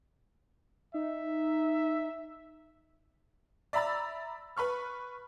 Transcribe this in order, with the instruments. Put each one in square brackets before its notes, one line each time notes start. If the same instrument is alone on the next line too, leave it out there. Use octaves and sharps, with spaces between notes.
[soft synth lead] D#4 [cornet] E5
[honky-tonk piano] D5 E5 A#5 B5 E6 A6
B4 B5 C#6 F6